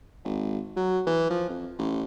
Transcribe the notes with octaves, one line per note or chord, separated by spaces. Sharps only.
G#1
F#3
E3
F3
F2
A1